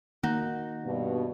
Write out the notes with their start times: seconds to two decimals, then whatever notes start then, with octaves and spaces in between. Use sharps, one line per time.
0.23 D#3 A#3 D#4 F#4
0.85 G2 B2